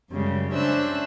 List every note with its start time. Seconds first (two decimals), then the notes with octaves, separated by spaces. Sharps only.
0.10 F#2 C#3 G3 G#3
0.53 C#4 D4 C5 E5 E6 F#6